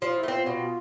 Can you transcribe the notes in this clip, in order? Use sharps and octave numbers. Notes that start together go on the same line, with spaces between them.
F3 F4
E4
A3
C4 F4
B2